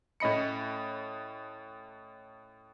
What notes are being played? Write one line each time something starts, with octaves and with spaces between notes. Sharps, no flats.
A2 C#4 D#5 B5 C#7